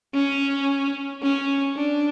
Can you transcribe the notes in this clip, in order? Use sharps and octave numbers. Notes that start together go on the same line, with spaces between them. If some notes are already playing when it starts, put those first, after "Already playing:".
C#4
C#4
D4